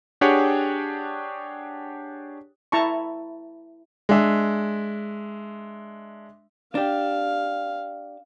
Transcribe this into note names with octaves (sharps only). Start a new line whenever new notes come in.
D4 G4 G#4 C#5 F#5 G5
E4 A5 A#5 C#6
G#3 D4 E5
D4 G4 F5